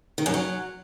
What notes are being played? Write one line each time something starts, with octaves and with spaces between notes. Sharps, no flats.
D#3
F#2
F#3